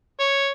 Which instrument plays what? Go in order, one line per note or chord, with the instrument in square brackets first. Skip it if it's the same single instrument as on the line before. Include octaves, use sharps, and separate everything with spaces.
[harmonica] C#5